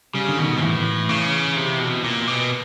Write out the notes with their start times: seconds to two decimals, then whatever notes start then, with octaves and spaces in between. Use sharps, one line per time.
0.14 C#3 G3
0.29 D3
0.38 B2 D#3
0.57 G#2
0.61 A2 E3
1.09 C#3
1.56 C3
1.80 B2
2.04 A#2
2.27 B2